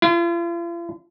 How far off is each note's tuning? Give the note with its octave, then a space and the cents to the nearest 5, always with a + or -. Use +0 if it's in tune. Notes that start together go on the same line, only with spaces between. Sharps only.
F4 -45